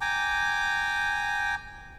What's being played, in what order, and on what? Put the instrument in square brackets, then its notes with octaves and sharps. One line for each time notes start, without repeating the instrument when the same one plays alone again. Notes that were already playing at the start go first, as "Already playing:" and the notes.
[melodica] G5 G#5 A#5 D6